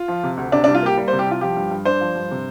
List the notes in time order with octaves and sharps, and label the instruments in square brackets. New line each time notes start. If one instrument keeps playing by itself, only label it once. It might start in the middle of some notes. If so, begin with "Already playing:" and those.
Already playing: [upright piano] F4
F3
C3
D2
C3 D4
D4
C2
F4
A#3 G4
G3
C5
C3
G4
C2 F4
F3 G4
G2
G2
D4 C5
F3
G2
C3